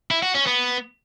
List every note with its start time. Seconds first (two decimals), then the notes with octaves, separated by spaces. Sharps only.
0.11 E4
0.22 F#4
0.34 C#4
0.46 B3